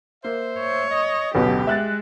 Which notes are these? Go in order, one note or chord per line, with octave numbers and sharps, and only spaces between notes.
A#3 C5 E5
C#5
D#5
A1 D2 B2 F#3 B3 G4
G#3 E5 F#6 A6